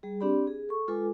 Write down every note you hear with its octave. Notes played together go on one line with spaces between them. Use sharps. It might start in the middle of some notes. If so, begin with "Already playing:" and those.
G3 G#4
C4 D4 G4 D5 B5
G#4
A4 C#6
G#3 F4 A4 B4 G#5 D6